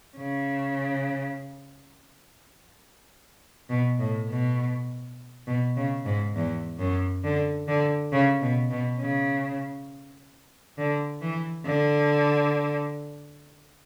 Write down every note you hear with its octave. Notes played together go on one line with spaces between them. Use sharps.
C#3
B2
A2
B2
B2
C#3
G#2
E2
F#2
D3
D3
C#3
B2
B2
C#3
D3
E3
D3